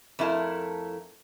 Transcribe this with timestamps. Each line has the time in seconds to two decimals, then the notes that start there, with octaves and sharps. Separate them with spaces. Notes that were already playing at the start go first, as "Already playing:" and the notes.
0.19 F2 A3 E4 A#4 A5